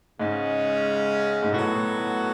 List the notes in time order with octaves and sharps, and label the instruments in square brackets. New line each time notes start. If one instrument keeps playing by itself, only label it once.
[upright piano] G#2 [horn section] C#3 G#3 C#4
[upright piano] G#2
[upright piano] A2 [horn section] F#3 B3 F#4 A4
[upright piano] A2
A2